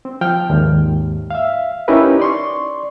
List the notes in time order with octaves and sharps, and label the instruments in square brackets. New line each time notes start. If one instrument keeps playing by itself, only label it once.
[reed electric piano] C4
F3 G5 F6
D#2 G#2
E5 F5
C#4 D#4 E4 G4 A#4 B4
D5 C6 C#6